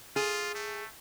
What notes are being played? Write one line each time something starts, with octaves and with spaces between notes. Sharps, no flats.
F4 G#4
A3